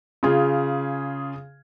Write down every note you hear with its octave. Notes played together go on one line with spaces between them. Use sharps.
C#3 F4 G#4